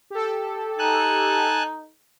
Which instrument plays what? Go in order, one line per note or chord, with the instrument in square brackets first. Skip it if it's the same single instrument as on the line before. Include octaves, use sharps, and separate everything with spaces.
[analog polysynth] G4 A4
[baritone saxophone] D#4 [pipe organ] G#5 A5 F#6